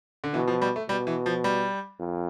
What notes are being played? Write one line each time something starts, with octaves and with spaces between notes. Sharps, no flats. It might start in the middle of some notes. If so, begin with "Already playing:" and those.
D3
B2 E3
F3
G3
A3
B2 G3
E3
F3
G3
F2